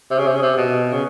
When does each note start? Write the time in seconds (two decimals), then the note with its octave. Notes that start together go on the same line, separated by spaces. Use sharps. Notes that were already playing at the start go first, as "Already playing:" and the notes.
0.11 C3
0.18 C#3
0.26 C3
0.35 C#3
0.43 C3
0.57 B2
0.93 C#3